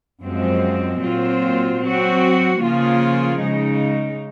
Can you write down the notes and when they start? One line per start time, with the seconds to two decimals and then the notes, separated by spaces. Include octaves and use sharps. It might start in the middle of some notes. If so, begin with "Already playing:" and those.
0.22 F#2 F3 G#3 C4
1.02 A#2 F#3 C4 F4 C5
1.80 F#3 C4 F#4
2.60 C#3 F3 A#3 F4 G#4
3.39 C#3 G#3 D#4